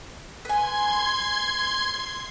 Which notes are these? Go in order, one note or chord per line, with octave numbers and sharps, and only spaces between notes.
B4 G#5 C6 G#6 C7